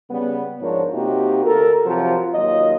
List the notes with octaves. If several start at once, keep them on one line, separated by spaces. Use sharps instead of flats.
C#3 G3 B3
G#2 F3 D4 A#4 C#5
C3 A#3 D#4 F#4 G4
D2 A4 A#4
C3 F3 F#3 F4 A#4
D#2 F#3 F4 D#5